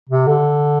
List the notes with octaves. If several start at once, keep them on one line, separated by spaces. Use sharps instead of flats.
C3
D3